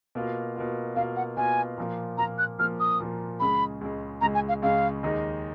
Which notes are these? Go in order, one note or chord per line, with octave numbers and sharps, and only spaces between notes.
B2 A#3 F4
B2 A#3 F4
B2 A#3 F4 F5
F#5
B2 A#3 F4 G#5
A#2 F3 A#3
A#2 F3 A#3 A#5
F#6
A#2 F3 A#3 F6
D#6
A#2 F3 A#3
C#2 C#3 G#3 B5
C#2 C#3 G#3
C#2 C#3 G#3 A#5
G#5
F5
C#2 C#3 G#3 F5
D#2 D#3 G#3 D#4